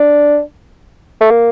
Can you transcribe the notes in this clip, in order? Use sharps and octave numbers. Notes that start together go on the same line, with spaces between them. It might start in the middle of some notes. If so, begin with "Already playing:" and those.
Already playing: D4
A3
A#3